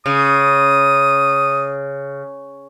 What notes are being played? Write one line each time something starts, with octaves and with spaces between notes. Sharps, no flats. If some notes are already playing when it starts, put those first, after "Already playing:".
C#3 D#6